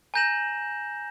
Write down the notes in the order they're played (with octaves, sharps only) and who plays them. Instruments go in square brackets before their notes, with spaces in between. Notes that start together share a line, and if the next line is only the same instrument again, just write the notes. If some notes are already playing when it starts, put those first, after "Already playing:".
[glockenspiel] G#5 A#5 G6 A#6 E7 F#7